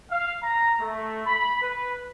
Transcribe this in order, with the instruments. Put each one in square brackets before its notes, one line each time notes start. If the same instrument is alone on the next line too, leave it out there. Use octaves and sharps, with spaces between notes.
[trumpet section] F5
A#5
A3
B5
B4